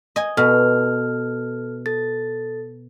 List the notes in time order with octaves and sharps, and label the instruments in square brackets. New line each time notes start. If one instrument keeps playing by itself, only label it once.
[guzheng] D#5 G#5
[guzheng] B2 [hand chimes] A4 F6
[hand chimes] A4 A6